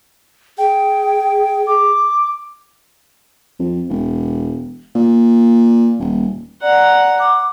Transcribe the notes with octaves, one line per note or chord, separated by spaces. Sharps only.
G#4 G5
D6
F2
E1
A#2
D#1
D5 F#5 A#5
D6